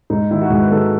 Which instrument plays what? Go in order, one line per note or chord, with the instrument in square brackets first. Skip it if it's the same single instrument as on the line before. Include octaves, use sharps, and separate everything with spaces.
[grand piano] G#2 D#4
D#3 F#3 E4
F#4
G#2 G#4
B4
D#3 F#3 A4